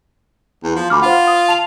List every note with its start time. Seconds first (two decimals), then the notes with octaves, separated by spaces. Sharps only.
0.63 E2
0.76 F3
0.90 D2 B5 D6 F6
1.02 F4 C5 F#5
1.27 D#6
1.48 A5 F7